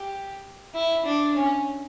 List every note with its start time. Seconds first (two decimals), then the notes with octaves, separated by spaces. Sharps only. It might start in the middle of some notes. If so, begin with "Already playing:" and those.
Already playing: G4
0.74 E4
1.05 D4
1.35 C#4